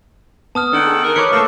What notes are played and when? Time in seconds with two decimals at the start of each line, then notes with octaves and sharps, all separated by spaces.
0.55 B3 A5 D#6 F6
0.73 D#3 D4 A4 F#5
0.87 G#4
1.04 D#4 A#4
1.16 B4 C#5 D6 C#7
1.33 A3 A#3 A4 A#4